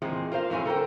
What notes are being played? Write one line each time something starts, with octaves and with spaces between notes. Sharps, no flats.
E2 A#2 G#3 C4
F4 A#4 C5 F5
F2 A2 F#3 G#5
A4 A#4 C5 G5